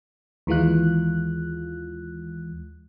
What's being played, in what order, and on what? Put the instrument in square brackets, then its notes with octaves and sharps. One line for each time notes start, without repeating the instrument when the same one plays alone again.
[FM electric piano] D#2 E3 G#3 F4 F#6